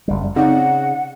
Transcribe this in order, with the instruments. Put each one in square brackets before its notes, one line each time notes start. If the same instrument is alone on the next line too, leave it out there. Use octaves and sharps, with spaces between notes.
[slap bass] F#1 G3
[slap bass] C#3 [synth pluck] C4 D#4 D5 [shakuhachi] F#5